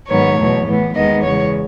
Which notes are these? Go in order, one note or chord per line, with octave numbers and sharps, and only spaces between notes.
G#2 D#3 F#3 B3 C#5
E2 B2 F#3 A3
A2 E3 B3
D#2 D#3 G#3 B3 D#5
E2 C#3 G#3 C#5